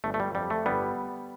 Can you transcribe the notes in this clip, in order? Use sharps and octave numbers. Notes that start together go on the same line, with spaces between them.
G1 A3
A3
G3
F2 G3
A3
G1 G3 B3